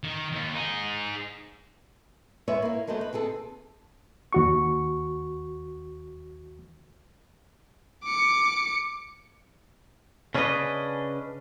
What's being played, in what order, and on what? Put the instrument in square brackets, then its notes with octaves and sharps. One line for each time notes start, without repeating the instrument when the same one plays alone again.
[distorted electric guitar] D#3
D#2
D#4 G#4
[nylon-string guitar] G#3 B3 B4 C#5 E5
A#3 E4
F#3 G#3 A3 B3 C5
B4
D#2 C4 G#4 A4
[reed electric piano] D#2 F#4 C#6
[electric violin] D6 C#7
[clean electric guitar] C#3 C#4 D4 G#4 B4 D#5